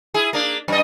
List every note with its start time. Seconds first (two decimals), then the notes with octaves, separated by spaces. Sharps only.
0.14 E4 G#4
0.33 A#3 D4
0.68 F#2 D#5